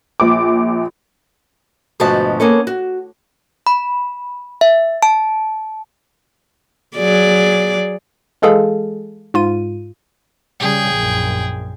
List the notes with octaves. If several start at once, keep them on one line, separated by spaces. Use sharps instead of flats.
A#1 D6
D2 G#2 B2 F3 F#4 A5
A#3 B3 C#4 A4
F#4
B5
E5
A5
F#3 G#4 D5
E3 G#3 G#4 A4 F5
G#2 F4 D#7
C#3 G3 G#4 G5
A#1 F#2